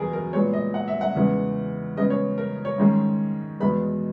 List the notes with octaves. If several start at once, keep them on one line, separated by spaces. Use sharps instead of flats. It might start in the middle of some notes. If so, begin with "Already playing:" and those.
Already playing: E2 B2 F#3 G#4 A#4 B4
A#4
A#2 G#3 B3 C#5
D#5
F#5
E5
F#5
E2 C#3 E3 G#3
C#3 G#3 B3 D#5
C#5
A#4
C#5
G#2 D#3 G#3 C#4
E2 B2 G#3 B3 B5